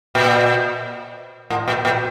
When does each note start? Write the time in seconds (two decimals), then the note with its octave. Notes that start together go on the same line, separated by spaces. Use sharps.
0.15 A#2
1.50 A2
1.68 A#2
1.85 A#2